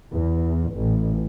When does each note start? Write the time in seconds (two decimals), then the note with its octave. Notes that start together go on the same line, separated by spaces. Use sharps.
0.12 E2
0.74 A1